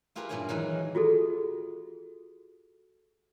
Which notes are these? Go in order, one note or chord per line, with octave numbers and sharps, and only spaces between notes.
E4 F4 G4 G#4 A#4 B4
G2 A#2 E4 F4 C#5 G#5
D#3 E3 F#3 G#3 D#4
F4 F#4 G#4 A4